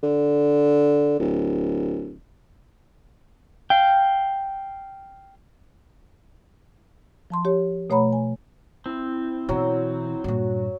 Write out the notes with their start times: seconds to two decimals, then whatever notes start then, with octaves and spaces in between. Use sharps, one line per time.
0.03 D3
1.19 D1
3.70 F5 G5
7.30 F3 A5 C6
7.45 G4 C#5
7.90 B2 A3 C#5 F#5 A#5 B5
8.13 G#5
8.86 C4 E4
9.49 B2 E3 F#3
10.24 G2 A#2 F#4